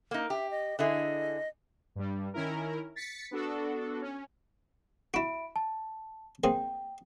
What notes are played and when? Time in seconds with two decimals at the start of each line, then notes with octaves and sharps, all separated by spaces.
0.11 A#3 D#4
0.30 G4 E5
0.51 D#5
0.79 D3 E4 G#4 D#5
1.96 G2 G3
2.34 D#3 C#4 E4 A#4
2.96 A6 B6 C#7
3.31 B3 D4 F#4 A4
4.01 C#4
5.14 E4 F#4 E5 B5 D7
5.56 A5
6.44 A#3 C4 G#4 G5